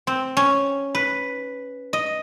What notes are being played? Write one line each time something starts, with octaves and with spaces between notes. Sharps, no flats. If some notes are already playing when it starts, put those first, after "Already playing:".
C4
C#4
B4
D#5